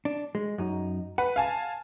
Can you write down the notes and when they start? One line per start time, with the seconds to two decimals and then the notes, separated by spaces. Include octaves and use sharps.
0.05 D4
0.35 G#3
0.58 F#2 D#4
1.18 B4 F#5
1.36 F5 G#5 A5